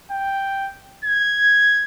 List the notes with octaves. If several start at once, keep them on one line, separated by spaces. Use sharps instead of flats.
G5
G#6